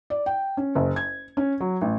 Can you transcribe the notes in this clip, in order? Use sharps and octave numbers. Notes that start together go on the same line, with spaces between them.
D5
G5
C#4
F#1
G#6
C#4
F#3
A1